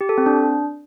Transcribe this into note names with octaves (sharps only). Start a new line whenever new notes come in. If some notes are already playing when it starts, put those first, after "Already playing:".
G4
A4
C4
D4